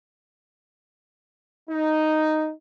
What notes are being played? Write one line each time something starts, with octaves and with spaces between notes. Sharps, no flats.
D#4